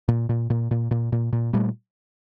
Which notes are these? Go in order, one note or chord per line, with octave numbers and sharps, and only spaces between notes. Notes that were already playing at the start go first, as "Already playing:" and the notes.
A#2
A#2
A#2
A#2
A#2
A#2
A#2
A#2 G3 A3